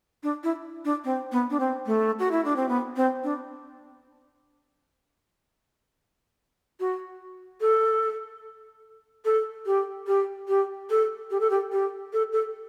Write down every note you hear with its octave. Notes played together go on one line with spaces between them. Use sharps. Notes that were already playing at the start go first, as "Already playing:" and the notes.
D4
E4
D4
C4
B3
D4
C4
A3
F#4
E4
D4
C4
B3
C4
D4
F#4
A4
A4
G4
G4
G4
A4
G4
A4
G4
G4
A4
A4